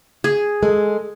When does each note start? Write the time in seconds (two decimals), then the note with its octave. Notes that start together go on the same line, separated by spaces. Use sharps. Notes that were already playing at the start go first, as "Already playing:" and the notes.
0.24 G#4
0.63 G#3 A4